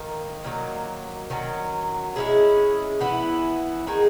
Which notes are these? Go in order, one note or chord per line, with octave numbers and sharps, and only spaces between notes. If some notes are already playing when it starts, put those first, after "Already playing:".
Already playing: D#3 A#3 D#4
D#3 F#3 A#3
D#3 F#3 C#4
G#3 C#4 E4 G#4
E3 B3 E4
D#3 G#3 D#4 G#4